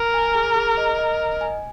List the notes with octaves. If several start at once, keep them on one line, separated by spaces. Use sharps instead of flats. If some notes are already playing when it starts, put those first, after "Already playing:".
Already playing: A#4
G#5
G#4
G#4
D#5
D#5
D#5
G#5